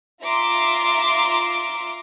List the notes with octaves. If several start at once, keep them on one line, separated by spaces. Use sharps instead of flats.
F4 E5 A#5 C6 D6